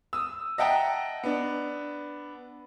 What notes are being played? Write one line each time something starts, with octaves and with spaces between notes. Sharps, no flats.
D#6 E6
D#5 E5 F#5 G5 A5 A#5
B3 D4